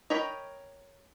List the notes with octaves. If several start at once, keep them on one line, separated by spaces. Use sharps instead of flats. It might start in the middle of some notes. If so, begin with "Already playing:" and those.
A#4 C#5 D#5 G5 B5